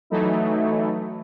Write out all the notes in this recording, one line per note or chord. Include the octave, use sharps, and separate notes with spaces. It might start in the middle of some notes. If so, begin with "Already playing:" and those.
E3 F#3 A3 D#4 E4